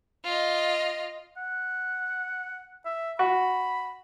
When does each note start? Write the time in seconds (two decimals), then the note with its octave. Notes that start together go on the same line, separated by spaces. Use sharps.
0.24 F4 D#5
1.37 F#5
2.85 E5
3.19 F#4 B5